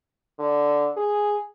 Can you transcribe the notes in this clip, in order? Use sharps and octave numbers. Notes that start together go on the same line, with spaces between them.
D3
G#4